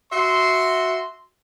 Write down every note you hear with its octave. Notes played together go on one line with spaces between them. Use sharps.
F#4 E5 C6